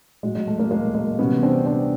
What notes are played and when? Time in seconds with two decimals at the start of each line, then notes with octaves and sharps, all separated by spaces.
0.23 A2 F#3 G#3
0.35 G#3
0.48 A3
0.59 G#3 A#3
0.71 G#3 A#3
0.95 G#3 A#3
1.19 C3 E3 G3 B3 C#4
1.43 C4 D4
1.66 C4 D4